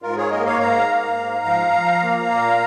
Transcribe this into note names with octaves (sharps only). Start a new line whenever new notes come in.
G#2 F4 A#4
G#4 C#5
A#3 A#4 D#5
C#5 F5
G#2 F5 A#5
A#3
G#2
F3
F3
A#3
A#2